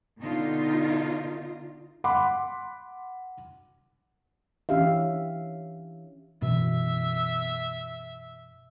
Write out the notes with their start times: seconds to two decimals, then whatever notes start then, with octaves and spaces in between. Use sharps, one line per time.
0.19 B2 D3 D#4 F4
2.04 F#5 B5 C6 D6
4.69 E3 C#4 D4 G4 E5 F5
6.42 F#2 B2 E3 E5